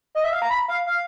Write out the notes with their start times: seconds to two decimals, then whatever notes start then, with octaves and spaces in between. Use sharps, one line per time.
0.15 D#5
0.24 E5
0.32 F5
0.42 A#5
0.50 B5
0.68 F5
0.86 F5